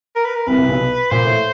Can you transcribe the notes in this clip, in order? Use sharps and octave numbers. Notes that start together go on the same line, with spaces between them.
A#4
B4
A#4
C2 C3 B4
C2 C3
B1 B2
A#2 C5
A2